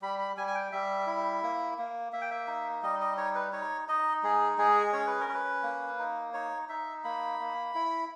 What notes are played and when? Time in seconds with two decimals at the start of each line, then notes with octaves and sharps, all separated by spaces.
0.02 G3 B5
0.19 B5
0.37 G3 G#5
0.47 G#5
0.55 G5
0.72 G3 E5
1.07 E4
1.43 A#3
1.78 A#3
2.12 A#3 E5
2.21 G5
2.31 E5
2.47 D#4
2.83 G3 D#5
3.01 D#5
3.17 D#4 C#5
3.35 B4
3.53 D#4 C#5
3.88 D#4 D#5
4.23 G#3 G#4
4.58 G#3 G#4
4.93 C#4 C#5
5.07 B4
5.20 A#4
5.28 C#4
5.34 B4
5.63 A#3
5.99 D#4
6.34 D#4 C#5
6.69 D#4 E5
7.04 A#3 B5
7.39 A#3
7.75 E4